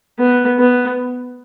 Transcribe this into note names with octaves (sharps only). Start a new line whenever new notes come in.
B3
B3